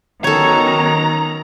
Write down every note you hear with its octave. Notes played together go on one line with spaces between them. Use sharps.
D#3 F#3 B3 C#4 A4 C#5 A#5